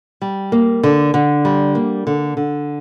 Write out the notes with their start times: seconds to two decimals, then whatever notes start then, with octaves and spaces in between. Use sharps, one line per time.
0.22 G3
0.52 A#3
0.83 D3
1.14 D3
1.45 G3
1.75 A#3
2.07 D3
2.37 D3